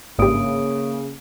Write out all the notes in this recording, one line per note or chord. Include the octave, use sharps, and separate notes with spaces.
G#1 G2 C#3 A#3 D#6 D7